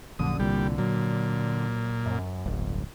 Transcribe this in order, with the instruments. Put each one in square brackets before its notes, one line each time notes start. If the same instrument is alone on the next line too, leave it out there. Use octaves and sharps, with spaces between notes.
[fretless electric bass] A#1 F#2 [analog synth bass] D3 [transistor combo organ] D#6
[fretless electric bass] C2 A#2 [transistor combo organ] G3
[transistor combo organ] A#2 [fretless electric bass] F#3
[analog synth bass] F#2
[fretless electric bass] D1 [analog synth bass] G1